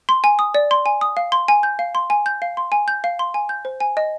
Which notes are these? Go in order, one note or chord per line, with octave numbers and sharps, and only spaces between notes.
C6
G#5
D#6
D5
C6
G#5
D#6
F5
C6
G#5
G6
F5
C6
G#5
G6
F5
C6
G#5
G6
F5
C6
G#5
G6
C5
G#5
D#5